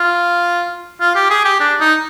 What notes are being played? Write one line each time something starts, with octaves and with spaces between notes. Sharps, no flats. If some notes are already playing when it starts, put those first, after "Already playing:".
Already playing: F4
F4
G4
G#4
G4
D4
D#4